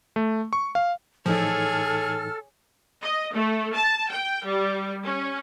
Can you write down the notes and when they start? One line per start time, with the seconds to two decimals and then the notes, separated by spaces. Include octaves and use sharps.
0.16 A3
0.53 C#6
0.75 F5
1.26 A2 E3 F3 D#4 G#4 A4 C#5 F6
3.02 D#5
3.34 A3
3.74 A5
4.11 G5
4.45 G3
5.04 C#4